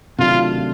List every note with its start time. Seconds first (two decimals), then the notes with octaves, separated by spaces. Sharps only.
0.19 C3 D#3 F#3 A3 D4 F4